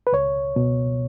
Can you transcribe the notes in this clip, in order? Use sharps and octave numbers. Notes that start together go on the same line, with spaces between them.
B4
C#2 C#5
B2